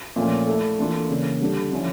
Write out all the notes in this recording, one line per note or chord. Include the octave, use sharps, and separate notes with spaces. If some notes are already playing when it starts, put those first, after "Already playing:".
A#2 F3 A3 C#4
A3 E4 A4
E3 A#3 D4 F4 A4
C#3 E3 A#3
D3 G3 D4 A4
D3 F3 C#4 E4